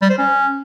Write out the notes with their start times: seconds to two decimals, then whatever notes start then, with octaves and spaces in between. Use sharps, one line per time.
0.02 G3
0.10 C5
0.18 C#4